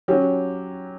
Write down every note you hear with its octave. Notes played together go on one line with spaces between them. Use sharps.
F#3 C#4 G4